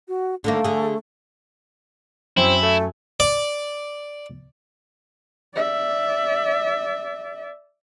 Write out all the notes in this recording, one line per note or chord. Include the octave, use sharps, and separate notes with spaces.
F#4
D3 D#3 A3 A#3
D3 G#4
F#2 C4 E4
A3
D5
D5 E5